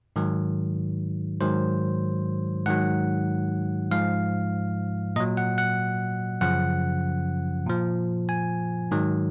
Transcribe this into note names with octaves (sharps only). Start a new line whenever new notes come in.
G#2 D#3 F#3
G#2 D#3 F#3 C5
G#2 D#3 F#3 F#5
G#2 F3 F5
A#2 F#3 D#5
F#5
F#5
F#2 C#3 F3 F#5
A#2 F3
G#5
G#2 D#3 F#3